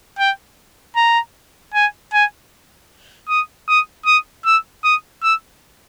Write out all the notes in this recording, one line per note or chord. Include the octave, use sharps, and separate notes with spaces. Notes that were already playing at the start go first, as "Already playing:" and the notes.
G5
A#5
G#5
G#5
D#6
D#6
D#6
E6
D#6
E6